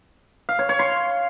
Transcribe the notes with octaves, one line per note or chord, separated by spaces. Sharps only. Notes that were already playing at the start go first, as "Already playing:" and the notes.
F5
C#5
C#5
C6